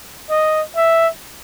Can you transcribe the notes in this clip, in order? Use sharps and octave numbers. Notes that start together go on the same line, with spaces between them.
D#5
E5